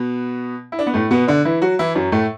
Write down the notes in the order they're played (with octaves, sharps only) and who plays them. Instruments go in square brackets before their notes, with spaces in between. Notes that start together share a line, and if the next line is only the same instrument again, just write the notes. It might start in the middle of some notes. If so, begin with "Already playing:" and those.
Already playing: [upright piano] B2 B3
E4
D4
B3
A2 A3
B2 B3
D3 D4
E3 E4
F#3 F#4
E3 E4
F#2 F#3
A2 A3